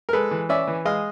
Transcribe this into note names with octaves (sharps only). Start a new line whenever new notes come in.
A#4
G#3 A4 B4
E3
C#4 D5 E5
E3
G#3 D#5 F5